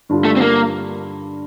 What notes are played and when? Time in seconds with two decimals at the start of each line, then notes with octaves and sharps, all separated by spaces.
0.09 G2 D3 G3 D4 F4
0.25 A3
0.36 C4
0.41 A#3